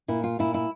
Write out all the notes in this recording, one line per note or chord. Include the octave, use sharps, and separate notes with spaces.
A#2 E4
F4
A#2 E4
E4